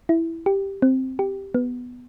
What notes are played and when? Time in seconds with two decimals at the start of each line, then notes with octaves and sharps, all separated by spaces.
0.09 E4
0.46 G4
0.82 C4
1.19 G4
1.54 B3